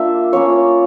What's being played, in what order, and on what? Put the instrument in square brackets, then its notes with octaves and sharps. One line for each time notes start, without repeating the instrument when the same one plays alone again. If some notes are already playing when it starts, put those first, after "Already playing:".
Already playing: [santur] A#3 D4 F4 E5
A#3 C#4 F4 C#5